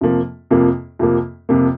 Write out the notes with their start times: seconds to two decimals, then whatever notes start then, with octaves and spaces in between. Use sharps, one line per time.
0.01 F2 C3 F3 A#3
0.51 F2 C3 F3 A#3
0.99 F2 C3 F3 A#3
1.49 F2 C3 F3 A#3